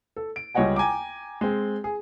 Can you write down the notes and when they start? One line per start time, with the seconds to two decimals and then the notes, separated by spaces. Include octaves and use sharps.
0.16 A4
0.36 D7
0.55 C#2 G3 C#5 D#5 F#5 G#5
0.76 G5 G#5 A#5 D6
1.41 G#3 C4
1.84 G#4